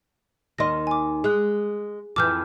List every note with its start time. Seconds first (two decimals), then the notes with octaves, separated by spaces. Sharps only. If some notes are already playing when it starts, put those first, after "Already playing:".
0.58 D#2 D#3 D#5 C6 A#6
0.87 G#5 D6
1.24 G#3 G#4 F#6
2.16 F2 E3 D6 F6 G6